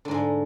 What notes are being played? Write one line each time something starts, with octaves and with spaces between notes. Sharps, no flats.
G#2 D3 G#3